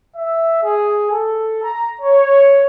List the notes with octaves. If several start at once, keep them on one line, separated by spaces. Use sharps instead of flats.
E5
G#4
A4
A#5
C#5